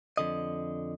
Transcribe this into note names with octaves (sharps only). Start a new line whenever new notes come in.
F2 D3 D#5